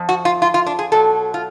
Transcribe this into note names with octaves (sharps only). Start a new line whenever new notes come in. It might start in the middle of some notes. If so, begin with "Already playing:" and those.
Already playing: F2 F3
F#4
F4
F4
F4
D4
G#4
B2 F#3 A4
F4